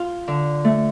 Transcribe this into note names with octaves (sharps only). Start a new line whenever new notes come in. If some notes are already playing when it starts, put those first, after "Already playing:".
Already playing: F4
D3
A3